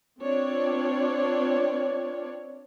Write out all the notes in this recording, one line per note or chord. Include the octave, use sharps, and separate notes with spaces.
C4 D4 F4 C#5 D5